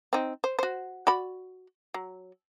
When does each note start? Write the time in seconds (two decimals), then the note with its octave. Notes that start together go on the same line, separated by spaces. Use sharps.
0.13 C4 D#4
0.44 C5
0.59 F#4 C5
1.07 F#4 D5 B5
1.94 F#3